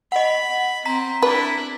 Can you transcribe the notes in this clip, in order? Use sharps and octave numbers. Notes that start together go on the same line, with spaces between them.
D#5 F#5 B5
C4 A#5 B6
D4 E4 B4